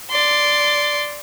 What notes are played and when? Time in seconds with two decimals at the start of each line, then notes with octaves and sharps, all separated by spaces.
0.11 D5 C6